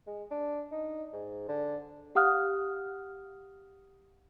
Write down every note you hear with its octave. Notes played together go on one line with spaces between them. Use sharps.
G#3
D4
D#4
G#2
D3
G4 F5 F#5 D#6 F6 F#6